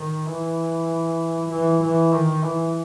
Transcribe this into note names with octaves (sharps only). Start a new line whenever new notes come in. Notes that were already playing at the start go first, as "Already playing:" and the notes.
Already playing: D#3
E3
E3
E3
D#3
E3